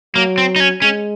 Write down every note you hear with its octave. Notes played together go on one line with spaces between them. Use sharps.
F#3 A#3
C4
D#4
C#4
G#3 C#4